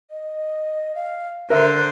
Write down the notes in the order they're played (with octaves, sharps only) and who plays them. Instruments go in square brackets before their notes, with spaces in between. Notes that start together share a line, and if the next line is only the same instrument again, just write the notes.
[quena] D#5
F5
[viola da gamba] D3 C5 [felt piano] A#4 E5 [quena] F#6